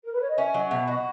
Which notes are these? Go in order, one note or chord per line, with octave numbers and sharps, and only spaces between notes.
A#4
B4
C#5
D#5
C#4 E5
F#3 D#5
B2 E5
F#4 D#5